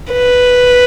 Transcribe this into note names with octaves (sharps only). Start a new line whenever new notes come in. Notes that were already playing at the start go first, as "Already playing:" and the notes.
B4